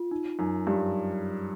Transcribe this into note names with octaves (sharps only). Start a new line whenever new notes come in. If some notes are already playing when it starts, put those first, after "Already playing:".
Already playing: F4
D#4
F#2 D#4
G2 G4